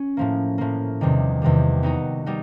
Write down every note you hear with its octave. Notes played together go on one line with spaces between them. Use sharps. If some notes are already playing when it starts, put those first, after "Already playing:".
Already playing: C#4
A2 F3 A#3
A2 F3 A#3
E2 C3 D#3 G3
E2 C3 D#3 G3
G3 B3 D#4 F#4
G3 B3 D#4 F#4